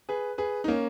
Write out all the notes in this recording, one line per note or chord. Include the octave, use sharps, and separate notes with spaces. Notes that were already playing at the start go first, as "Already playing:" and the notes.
G#4 B4
G#4 B4
D#4
A#3 C#4